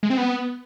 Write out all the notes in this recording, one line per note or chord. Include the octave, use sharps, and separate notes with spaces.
G#3
C4
B3